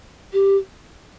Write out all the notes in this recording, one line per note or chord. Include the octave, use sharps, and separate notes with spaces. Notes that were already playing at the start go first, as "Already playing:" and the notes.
G4